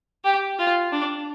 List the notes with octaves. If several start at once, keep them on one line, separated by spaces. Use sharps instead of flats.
G4
F4
D4